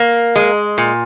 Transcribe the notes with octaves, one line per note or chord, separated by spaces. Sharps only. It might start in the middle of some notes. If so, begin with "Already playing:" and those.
Already playing: A#3
G#3
A#2